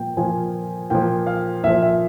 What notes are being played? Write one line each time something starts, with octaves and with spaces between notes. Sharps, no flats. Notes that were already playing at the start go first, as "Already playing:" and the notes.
Already playing: A#2 F3 G5
A#2 F3 G#5
A#2 F3 G5
F5
A#2 F3 E5
E5